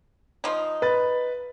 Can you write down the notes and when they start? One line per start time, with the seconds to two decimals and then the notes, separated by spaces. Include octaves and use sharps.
0.44 F3 D#4
0.82 B4 A6